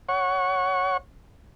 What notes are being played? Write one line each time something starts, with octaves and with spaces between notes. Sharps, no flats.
C#5 F#5 C#6